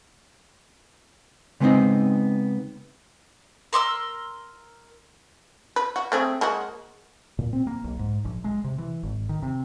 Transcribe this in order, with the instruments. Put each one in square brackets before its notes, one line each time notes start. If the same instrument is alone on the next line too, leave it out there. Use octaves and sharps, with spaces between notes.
[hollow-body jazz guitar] C#3 G#3 A3 B3 C4 D#4
[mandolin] A#4 C6 D6 E6
[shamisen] B4
F#4
A3 C4 G#4
G#3 A#3 F#4
[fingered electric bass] A#2
C4
A#3
B1
G#2
A#1
G#3
C3
E3
G#1
D#3
C3